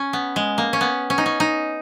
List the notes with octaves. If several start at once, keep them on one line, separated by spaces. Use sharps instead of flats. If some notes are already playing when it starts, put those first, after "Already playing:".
Already playing: C#4
B3
G#3
A#3
C#4
B3
C#4
D#4
C#4
D#4